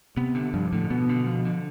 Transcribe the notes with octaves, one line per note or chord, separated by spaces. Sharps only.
C3 B3
D3
G2 F3
A2 D3
B2 B3
D3
F3
D3